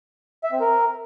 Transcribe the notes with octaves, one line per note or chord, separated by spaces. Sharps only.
E5
C4
A#4